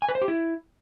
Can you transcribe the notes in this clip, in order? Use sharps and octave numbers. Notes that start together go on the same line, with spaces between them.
G#5
B4
C5
G4
E4